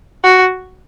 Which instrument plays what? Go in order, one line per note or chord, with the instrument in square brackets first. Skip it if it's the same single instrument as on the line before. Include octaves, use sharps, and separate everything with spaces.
[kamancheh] F#4